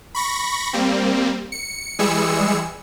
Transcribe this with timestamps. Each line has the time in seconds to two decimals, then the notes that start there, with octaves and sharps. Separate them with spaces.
0.15 B5 C#6 A#6
0.73 G3 A#3 C4
1.52 C#7
1.99 E3 G3 G#3 G#4 E6 C#7